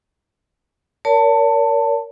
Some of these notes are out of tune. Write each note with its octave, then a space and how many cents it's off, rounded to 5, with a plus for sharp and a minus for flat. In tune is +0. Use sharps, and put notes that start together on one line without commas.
A#4 +0 C#5 +40 A5 +20